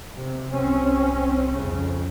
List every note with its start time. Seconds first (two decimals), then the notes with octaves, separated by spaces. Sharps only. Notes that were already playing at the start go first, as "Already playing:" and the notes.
0.16 C3
0.54 C2 C4 C#4
1.54 F2 C#3